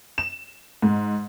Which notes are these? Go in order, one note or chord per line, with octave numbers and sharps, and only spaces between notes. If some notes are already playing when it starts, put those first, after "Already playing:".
E7
G#2